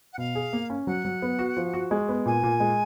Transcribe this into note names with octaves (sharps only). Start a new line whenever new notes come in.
F#5
B2 F5
G#4
A#3
C#4
F#3 F#5
F#3
B3
F#4
F3
F#4
G#3
B3
A#2 G#5
A#2
G#3